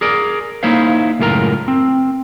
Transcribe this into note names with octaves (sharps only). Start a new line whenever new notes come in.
G#4 A#4 D5
A#3 D#4 E4 C5 C#5 F5
C#2 F#2 A2 F4 A#4 A#5
C4